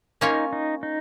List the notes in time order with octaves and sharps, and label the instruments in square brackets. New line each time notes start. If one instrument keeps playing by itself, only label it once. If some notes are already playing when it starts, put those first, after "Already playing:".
[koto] A#3 C#4 F4 C#5 [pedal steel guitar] D#4
[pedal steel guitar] D#4
D#4